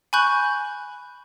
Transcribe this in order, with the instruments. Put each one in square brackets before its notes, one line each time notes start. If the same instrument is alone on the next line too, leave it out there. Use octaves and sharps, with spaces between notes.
[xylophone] G#5 B5 C#6 F#6 G6